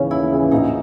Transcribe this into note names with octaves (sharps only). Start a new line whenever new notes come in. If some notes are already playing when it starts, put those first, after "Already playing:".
Already playing: D#2 C#3 E3 C#4
D#2 E4
C#3 E3
A#1 D#4